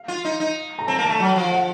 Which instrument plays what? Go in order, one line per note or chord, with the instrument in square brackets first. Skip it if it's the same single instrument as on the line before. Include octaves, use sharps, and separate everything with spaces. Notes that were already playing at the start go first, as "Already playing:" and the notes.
Already playing: [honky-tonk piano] F5
[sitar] F4
D#4
D#4
[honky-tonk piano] A#5
[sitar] C4 [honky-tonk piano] A5
[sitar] A#3
[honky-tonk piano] A5
[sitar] A3
F#3
F3
[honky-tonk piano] F#5